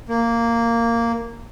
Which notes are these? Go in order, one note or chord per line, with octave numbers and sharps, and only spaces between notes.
A#3